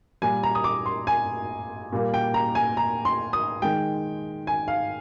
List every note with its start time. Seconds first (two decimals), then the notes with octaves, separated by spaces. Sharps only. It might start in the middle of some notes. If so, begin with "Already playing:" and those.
0.22 A#2 G3 A#3 G#5
0.43 A#5
0.55 D#6
0.64 D6
0.86 C6
1.07 G#5
1.92 A#2 G3 A#3
2.14 G5
2.34 A#5
2.55 G#5
2.77 A#5
3.05 C6
3.33 D#6
3.62 D#3 G#3 G5
4.47 G#5
4.68 F5